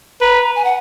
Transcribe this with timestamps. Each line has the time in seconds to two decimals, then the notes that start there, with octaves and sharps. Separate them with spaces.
0.21 B4 A#5
0.56 G#5
0.64 F#5